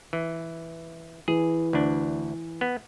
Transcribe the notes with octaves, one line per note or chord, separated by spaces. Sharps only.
E3
E3 G#4
D2 D4
B3